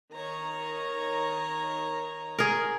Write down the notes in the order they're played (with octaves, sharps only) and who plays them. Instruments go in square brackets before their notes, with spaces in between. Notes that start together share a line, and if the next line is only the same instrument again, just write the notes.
[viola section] D#3 C#5 A#5
[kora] G#4 A#4